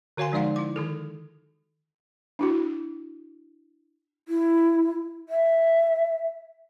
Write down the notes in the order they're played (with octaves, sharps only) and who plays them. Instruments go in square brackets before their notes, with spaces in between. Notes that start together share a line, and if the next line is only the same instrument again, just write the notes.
[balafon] D3 F#4 C#5 F5 G#5 C6
F3 G#3 D#4 D5 F5 F#5
E4 D6
D#3 G#4 A4
D4 E4 F#4
[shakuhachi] E4
E5